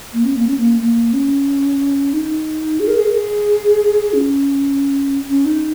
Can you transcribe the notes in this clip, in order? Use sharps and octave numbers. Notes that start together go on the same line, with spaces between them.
A#3
C#4
A#3
C#4
A#3
A#3
C#4
D#4
G#4
A#4
G#4
A#4
G#4
C#4
C#4
D#4